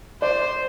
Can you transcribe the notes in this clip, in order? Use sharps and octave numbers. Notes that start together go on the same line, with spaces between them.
C5 D5